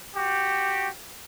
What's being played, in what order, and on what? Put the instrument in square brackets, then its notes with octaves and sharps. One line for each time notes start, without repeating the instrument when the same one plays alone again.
[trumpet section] F#4 G4